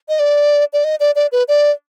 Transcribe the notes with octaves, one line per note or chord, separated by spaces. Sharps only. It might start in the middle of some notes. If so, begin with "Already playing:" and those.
D#5
D5
D5
D#5
D5
D5
B4
D5